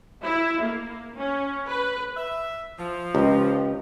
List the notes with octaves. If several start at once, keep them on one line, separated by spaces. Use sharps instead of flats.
E4
A#3
C#4
B4
E5
F3
C#2 G4 D#5